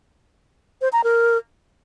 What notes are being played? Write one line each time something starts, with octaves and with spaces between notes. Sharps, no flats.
C5
A#5
A#4